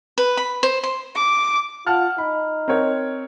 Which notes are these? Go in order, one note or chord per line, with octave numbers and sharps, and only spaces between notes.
B4
B5
C5
C6
D6
F4 F#5 A5 F6
D#4 B5
C4 A#4 C#5